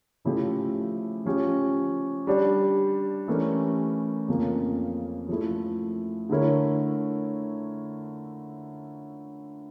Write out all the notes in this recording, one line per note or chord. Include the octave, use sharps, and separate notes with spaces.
C#3 F3 A3 E4 G4
F3 C#4 G4
G3 D4 G4
E3 A3 C#4 G4 A#4
F2 C#3 F3 A#3
F3 A3 E4
D3 A3 E4 A#4 C#5